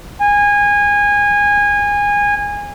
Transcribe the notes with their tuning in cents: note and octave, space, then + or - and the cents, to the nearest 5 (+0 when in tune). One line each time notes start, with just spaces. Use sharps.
G#5 -20